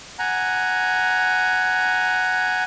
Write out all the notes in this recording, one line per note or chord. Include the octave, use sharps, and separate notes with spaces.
F#5 G#5 A#5